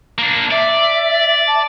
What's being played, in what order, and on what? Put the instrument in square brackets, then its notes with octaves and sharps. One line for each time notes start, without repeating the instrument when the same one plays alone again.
[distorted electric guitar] A#3 D4
[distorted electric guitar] D5 [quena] E5
[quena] A5